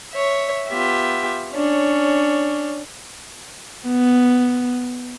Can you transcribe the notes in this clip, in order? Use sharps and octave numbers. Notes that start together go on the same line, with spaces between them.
C#5 E5
B3 F4 G4 E5
C#4 D4 C#5
B3